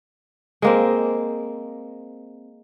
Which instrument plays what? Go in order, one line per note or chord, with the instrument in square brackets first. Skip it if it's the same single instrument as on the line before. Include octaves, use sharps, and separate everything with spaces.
[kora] G#3 A#3 C4